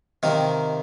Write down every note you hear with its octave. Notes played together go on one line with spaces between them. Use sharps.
C3 D#3 A#3